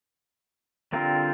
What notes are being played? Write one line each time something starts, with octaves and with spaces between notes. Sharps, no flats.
D3 G3 C4 F4 A#4